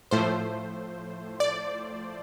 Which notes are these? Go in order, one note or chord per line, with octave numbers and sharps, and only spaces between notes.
A2 F3 A3 C5
D5